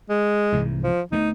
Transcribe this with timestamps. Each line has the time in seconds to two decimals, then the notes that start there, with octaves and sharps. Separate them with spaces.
0.10 G#3
0.52 C2 G#2 E3
0.84 F3
1.12 D2 A3 B3 D#4